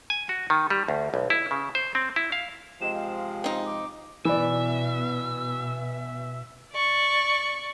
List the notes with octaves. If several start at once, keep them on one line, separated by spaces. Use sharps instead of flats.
G#5
F#4
D#3
G3
D2
B1
E4
C#3
C5
C4
E4
F5
C3 F3 G#3 E7
F5
C4 D#4
D6
B2 E3 D5 E5
D5 C#6